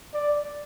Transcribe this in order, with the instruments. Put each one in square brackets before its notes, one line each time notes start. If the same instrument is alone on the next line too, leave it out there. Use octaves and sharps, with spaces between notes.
[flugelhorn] D5